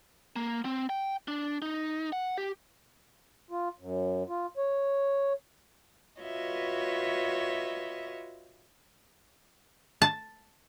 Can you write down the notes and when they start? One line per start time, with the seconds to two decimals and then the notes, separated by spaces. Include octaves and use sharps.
0.36 A#3
0.65 C4
0.89 G5
1.28 D4
1.62 D#4
2.13 F#5
2.38 G4
3.51 F4
3.79 F#2
4.29 F4
4.57 C#5
6.21 F4 F#4 B4 C#5 D#5 E5
10.02 A5